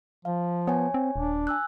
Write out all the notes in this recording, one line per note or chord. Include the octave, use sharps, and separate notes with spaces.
F3 F5
B3 C#5 G#5
C4
D#1 D4
G#5 E6 F#6